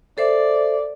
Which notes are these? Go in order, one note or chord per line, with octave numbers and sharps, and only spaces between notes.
A4 C5 D5 E5